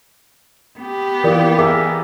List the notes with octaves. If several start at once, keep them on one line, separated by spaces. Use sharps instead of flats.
B3 G4
E3 F4 A#4 D5
G#4 A#4 E5 D6